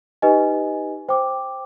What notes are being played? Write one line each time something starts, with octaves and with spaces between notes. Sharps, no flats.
D#4 G4 B4 D#5 G#5
C5 G5 D6